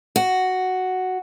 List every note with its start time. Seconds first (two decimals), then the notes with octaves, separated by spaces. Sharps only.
0.16 F#4